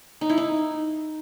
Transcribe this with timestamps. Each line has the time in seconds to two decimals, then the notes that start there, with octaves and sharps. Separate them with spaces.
0.21 D#4
0.29 E4
0.38 D#4